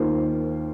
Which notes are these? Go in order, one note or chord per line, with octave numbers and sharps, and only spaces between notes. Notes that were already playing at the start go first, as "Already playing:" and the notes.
Already playing: D#2 D#3 A#3 F4 C5